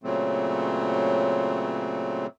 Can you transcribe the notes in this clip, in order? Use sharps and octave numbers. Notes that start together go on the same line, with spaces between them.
A#2 C#3 F#3 A3 C4